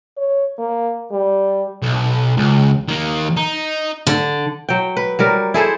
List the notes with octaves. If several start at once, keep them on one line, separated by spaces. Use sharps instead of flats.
C#5
A#3
G3
B1
C#2
D#3 A#3
D#4
D3
F#3 G5
B4
F#3 G3 A#4
E4 G#4 A4 C5